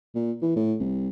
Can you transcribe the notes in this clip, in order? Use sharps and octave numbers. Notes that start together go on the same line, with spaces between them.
A#2
E3
A2
C2